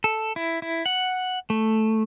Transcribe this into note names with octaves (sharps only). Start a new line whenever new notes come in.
A4
E4
E4
F#5
A3